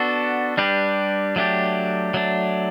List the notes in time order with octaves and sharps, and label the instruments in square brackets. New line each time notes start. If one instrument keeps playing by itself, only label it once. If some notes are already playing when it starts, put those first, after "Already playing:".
Already playing: [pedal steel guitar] B3 D4 F#4 A4
G3 D4 G4 B4
F#3 A3 D4 G4
F#3 A3 D4